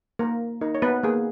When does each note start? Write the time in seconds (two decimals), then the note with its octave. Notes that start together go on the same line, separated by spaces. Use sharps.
0.19 A#3 A#4
0.61 D#4 A#4
0.75 C#5
0.82 B3 B4
1.03 A#3 G#4